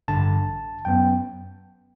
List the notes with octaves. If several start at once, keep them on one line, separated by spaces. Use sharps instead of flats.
A1 G2 D3 A5
F#2 F#3 B3 G5